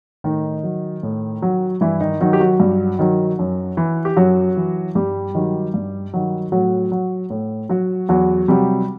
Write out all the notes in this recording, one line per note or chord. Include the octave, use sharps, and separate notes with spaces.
A2 D#3 D#4
F#3
A2
F#3
G2 E3 E4
D#3 D#4
D#3 F#3 D#4
G4
F#3 F#4
G2
D#3 F#3
F#2
E3
G4
F#2 F#3 F#4
E3
G2 G3 G4
D#3 F#3
G2
D#3 F#3
A2 F#3 F#4
F#3
A2
F#3 F#4
E2 F#3 F#4
C3 F#3 G3 G4